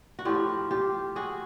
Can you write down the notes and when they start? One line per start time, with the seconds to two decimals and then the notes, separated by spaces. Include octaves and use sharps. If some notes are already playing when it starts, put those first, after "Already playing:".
0.19 F#4
0.25 A2 F3 F4 G4
0.71 F4 G4
1.16 F#4 G#4